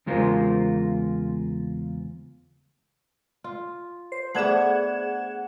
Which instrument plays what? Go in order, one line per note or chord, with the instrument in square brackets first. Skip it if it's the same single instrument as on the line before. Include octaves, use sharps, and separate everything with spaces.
[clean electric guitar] E2 C#3 G#3 F4 A#4 C5
[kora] F4
[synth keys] C5
[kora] A3 B3 D4 [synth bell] G#4 C5 [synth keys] F#5 G#6 E7